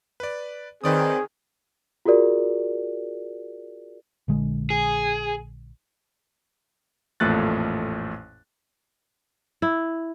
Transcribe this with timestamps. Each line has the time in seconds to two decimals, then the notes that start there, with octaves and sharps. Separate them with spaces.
0.20 B4 D5
0.84 D#3 C4 G#4 B4 D5 D#6
2.05 F4 F#4 G#4 A#4 D5
4.28 A#1 D3 G#3
4.70 G#4
7.20 A1 F2 A#2 A3 F#6 A6
9.62 E4